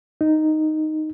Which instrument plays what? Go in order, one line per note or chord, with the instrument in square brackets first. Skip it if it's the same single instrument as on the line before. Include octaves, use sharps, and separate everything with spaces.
[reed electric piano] D#4